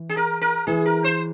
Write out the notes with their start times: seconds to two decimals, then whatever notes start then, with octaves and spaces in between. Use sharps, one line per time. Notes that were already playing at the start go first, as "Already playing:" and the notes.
Already playing: E3
0.10 G#4
0.17 A#4
0.42 A#4
0.67 E3 G#4
0.86 A#4
1.04 C5